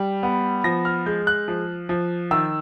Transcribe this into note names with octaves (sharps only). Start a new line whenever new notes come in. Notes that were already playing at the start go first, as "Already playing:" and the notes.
Already playing: G3
B3
F3 A#6
F6
G#3 G6
F#6
F3
F3
D#3 E6